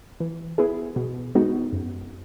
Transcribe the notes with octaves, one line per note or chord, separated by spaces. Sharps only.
E3
B3 E4 G#4
B2
G#3 B3 D#4 F#4
F#2